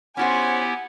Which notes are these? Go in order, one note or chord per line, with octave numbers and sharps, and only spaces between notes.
B3 C#4 E4 F#4 G4 C5 F#5 G#5